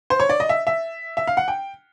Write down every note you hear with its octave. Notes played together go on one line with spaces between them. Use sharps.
C5
C#5
D5
D#5
E5
E5
E5
F5
F#5
G5